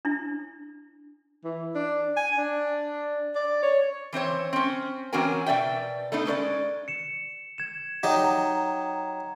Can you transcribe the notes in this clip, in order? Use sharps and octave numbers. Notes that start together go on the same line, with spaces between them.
D4 E4
E3
D4
G#5
D4
D5
C#5
E3 C4 C5 C#5
C4 C#4
E3 C4 C#4 F#4 A#4 G#5
B2 D5 E5 G5
A3 B3 D4 D#4
G#3 C#4 B4 D5
C#7 E7
G#6 E7
F#3 D#4 G4
A#5